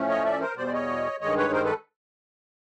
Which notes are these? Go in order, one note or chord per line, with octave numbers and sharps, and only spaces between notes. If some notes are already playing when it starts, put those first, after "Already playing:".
Already playing: A2 F3 A3 C#4
C#5 D#5
D5 E5
A#4 C5
E2 B2 G3 C5 D5
D5
C#5 D#5
G2 D#3 G#3 C#5 D#5
B4 C#5
A#4 C5
A4 B4